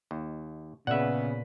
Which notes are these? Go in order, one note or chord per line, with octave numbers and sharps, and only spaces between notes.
D#2
A#2 C#3 B3 B4 D5 E5 F#5